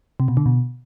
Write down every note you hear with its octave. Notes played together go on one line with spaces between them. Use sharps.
C3
B2
D3
B2